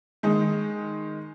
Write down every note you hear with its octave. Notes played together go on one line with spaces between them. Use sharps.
D#3 G#3 D#4